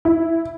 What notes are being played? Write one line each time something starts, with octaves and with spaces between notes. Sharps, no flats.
E4